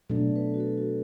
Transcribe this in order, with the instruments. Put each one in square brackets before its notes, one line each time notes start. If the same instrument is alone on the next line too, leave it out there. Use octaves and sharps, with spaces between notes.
[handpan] B2 F#3 A3 D4 [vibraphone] A4
[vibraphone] B4
F#4
A4
F#4